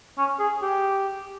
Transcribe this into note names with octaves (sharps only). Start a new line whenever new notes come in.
C#4
G#4
G4